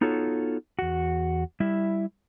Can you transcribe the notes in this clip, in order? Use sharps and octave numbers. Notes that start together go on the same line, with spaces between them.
B3 D#4 F4 F#4 A4 C#5
E2 F#4
G3 E4 E5